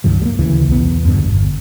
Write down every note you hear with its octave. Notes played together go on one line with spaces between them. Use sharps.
C#2 G2 D#3 F#3
G3 A#3
D2 C#3 E3
B1 E2 B3
E2 G2 B2 D3
G1